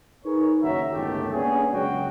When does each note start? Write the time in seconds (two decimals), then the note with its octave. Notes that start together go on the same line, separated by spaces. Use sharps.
0.25 D#4 G#4 A#4 B4 C#5
0.62 F#1 D#3 F#4 C#5 E5 A#5
0.92 G1 C#2 A2 D#3 A3 G4
1.32 A#3 B3 C#4 D4 G#4
1.72 C#2 F#2 F#3 G#3 F#4 G5